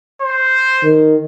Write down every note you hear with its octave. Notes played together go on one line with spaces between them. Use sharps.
C5
D#3